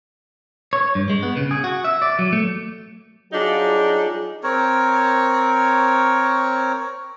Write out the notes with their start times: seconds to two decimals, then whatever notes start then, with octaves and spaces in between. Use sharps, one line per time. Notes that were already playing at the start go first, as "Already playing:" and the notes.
0.73 C#5
0.95 G2
1.10 G#3
1.23 B3
1.37 C#3
1.51 G#4
1.64 F#4
1.84 E5
2.02 D5
2.19 F#3
2.33 A3
3.33 F#3 G3 D4 D#4 F4 G#4
4.43 C4 A#4 C#5